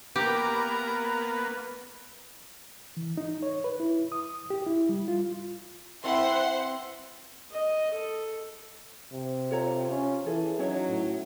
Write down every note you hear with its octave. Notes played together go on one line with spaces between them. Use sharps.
A#3 B3 G4 A#4 B4 A#5
E3
D#4
C#5
B4
E4
D#6
G4
E4
G3
F4
C4 E4 B4 C5 F#5 C6
D#5
A4
C3
F4 A4 C#5 A#5
C#4
E3 G#4 A4
F#3 C#4 D#4 E4 C#5
A2